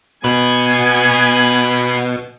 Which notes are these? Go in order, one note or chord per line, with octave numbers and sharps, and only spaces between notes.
B2 B3 F#4 B4 G#5